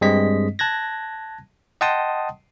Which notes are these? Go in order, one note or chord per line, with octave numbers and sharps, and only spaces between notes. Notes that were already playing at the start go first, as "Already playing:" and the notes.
G2 G3 G#3 C4 D#5 B6
A5 F#6 G#6 A#6
D#5 F#5 G5 A5 C6 D#6